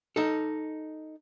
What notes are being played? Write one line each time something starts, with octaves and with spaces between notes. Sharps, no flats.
D#4 A4